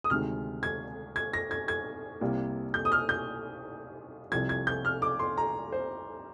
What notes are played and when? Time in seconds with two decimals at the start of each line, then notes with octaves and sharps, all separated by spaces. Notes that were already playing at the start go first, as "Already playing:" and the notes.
0.04 D#6
0.10 D2 C3 D#3 G#3 F6
0.63 G#6
1.16 G#6
1.33 A#6
1.51 G#6
1.68 G#6
2.21 C2 C3 G3 A#3
2.74 G6
2.85 D#6
2.92 F6
3.09 G6
4.32 C2 C3 F3 G#6
4.49 G#6
4.67 G6
4.85 F6
5.02 D6
5.19 C6
5.38 A#5
5.72 C5